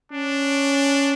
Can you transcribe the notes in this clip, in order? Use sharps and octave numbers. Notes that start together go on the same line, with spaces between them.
C#4 D4